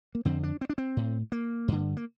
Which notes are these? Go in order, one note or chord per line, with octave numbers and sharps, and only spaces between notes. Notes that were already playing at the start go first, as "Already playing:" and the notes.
A#3
F2 D3 C4
D4
C4
D4
C4
A2
A#3
G2 D3
A#3